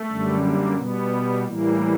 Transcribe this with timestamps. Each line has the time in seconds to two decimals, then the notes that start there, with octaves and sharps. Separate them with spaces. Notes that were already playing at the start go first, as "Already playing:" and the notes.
Already playing: A3
0.09 F#2 D3 G3
0.43 A#3
0.76 B2 G3 B3
1.44 A2 E3 G3 A#3